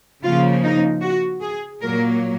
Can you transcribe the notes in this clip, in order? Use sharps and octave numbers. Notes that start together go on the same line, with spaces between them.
C#3 F3 A#3 F4
D#4
F#4
G#4
A#2 F#3 A#3 A#4